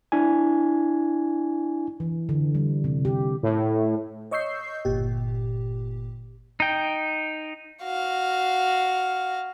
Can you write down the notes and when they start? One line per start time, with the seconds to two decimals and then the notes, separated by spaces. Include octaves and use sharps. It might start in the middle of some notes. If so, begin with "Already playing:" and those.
0.12 D4 E4 G#5
2.00 E3
2.29 D3
2.55 G3
2.84 C3
3.05 G4
3.43 A2
4.31 C#5 D#5 C#6 E6 G6 C7
4.85 G1 A#2 G4
6.60 D#4 G5
7.83 F#4 F5